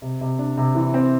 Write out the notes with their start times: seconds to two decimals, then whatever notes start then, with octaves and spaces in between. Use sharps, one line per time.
0.02 C3
0.21 C3
0.39 D4
0.57 C3
0.75 E3
0.94 C4